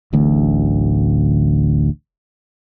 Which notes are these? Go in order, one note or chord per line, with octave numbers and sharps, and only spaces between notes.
D1 A1 D2